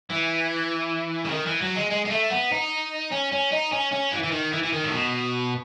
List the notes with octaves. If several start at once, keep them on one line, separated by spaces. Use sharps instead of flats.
E3
C#3
D#3
E3
F#3
G#3
G#3
G#3
A3
B3
D#4
C#4
C#4
D#4
C#4
C#4
E3
E3
D#3
E3
E3
D#3
A2
B2